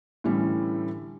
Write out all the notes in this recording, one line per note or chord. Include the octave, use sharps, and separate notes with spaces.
A2 D3 E3 G3 A3 C#4